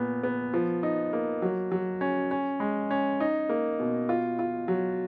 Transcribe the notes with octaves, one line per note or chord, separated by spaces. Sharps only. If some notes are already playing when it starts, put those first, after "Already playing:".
Already playing: A#2 B3
B3
F3
D#4
A#3
F#3
F#3
C#4
C#4
G#3
C#4
D#4
A#3
B2
F4
F4
F#3